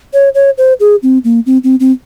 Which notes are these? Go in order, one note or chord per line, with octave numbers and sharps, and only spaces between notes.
C#5
C#5
C5
G#4
C4
A#3
C4
C4
C4